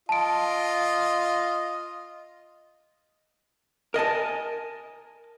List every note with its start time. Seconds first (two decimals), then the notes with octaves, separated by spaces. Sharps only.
0.09 F4 D#5 A5 D7
3.94 A#4 D#5 G#5 A5